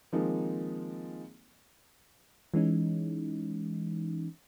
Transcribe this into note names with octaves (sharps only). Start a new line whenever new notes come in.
D#3 F3 G#3 A#3 C4 D#4
E3 G#3 C#4 D#4